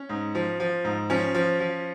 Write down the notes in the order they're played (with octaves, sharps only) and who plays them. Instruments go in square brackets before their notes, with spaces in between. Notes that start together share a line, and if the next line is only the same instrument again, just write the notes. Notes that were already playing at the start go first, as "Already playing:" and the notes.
Already playing: [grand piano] C#4
G#2
F3
F3
G#2
F3 C#4
F3
F3